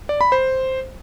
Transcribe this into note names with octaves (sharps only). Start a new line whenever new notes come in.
D5
B5
C5